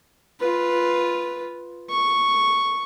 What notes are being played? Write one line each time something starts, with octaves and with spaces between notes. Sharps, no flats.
F4 B4
C#6